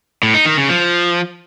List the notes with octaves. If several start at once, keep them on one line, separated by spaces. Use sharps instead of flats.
A2
D#4
D#3
C#3
F3